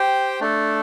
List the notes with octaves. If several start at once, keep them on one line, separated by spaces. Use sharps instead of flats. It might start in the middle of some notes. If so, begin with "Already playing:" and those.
Already playing: G4 C5 G5
A3 D4 A4